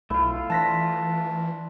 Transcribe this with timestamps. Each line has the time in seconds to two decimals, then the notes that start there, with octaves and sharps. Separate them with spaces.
0.10 B1 A3 E4 F4
0.50 E3 D4 C5 A5 A#6 B6